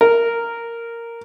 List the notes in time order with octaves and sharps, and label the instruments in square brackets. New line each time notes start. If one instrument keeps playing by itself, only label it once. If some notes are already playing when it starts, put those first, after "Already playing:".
[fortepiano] A#4